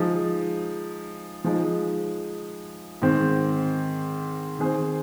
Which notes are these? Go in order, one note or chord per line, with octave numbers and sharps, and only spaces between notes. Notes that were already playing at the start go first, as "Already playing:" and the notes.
Already playing: F3 G#3 D#4
F3 G#3 D#4
G#2 D#3 C4
D#3 C4 G#4 C5